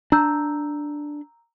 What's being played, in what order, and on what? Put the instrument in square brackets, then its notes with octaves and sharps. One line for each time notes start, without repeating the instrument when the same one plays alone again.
[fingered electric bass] D4 [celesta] A#5 E6 G6